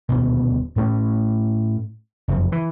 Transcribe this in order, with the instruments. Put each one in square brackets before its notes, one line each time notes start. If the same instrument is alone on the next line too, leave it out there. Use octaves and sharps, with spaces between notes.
[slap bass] D#1 D2 B2
A2 A3 A#3 C#4
F#1 F2
E3